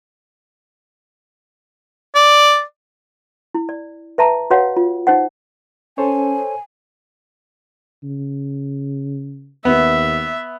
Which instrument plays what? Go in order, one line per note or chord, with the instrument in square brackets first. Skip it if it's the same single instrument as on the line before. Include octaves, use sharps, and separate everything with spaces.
[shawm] D5
[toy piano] E4
D5
B4 E5 A5 A#5
F#4 B4 C#5 F5 F#5
F4
D#4 C5 F#5
[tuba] C#4 [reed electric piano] A4 C5 C#5 [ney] G#5
[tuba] C#3
[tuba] D#2 [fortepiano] B3 [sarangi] E5